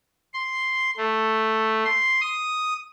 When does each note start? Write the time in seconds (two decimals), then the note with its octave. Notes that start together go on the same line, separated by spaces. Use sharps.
0.34 C6
0.97 A3
1.85 C6
2.21 D#6